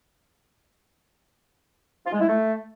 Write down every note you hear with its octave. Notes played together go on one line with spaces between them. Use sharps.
F4
G#3
E4
A3